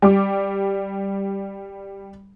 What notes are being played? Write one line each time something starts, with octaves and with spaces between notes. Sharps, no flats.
G3 D6